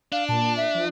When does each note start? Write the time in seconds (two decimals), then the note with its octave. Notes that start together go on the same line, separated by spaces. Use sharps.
0.12 D4 F5
0.29 A#2 A5
0.57 E5
0.75 F3